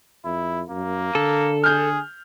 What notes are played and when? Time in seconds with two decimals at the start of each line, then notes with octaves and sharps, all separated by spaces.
0.25 F2 E4
0.70 F#2 A#3
1.15 D3 A4
1.64 G#4 F6 G6